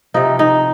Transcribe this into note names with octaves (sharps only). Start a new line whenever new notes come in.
C3 F3 D#4
D#4